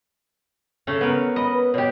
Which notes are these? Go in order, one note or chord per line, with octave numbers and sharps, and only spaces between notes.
C#3 A3 C#4
B3 A#4
D#5 B5
B4
B2 G4 C#5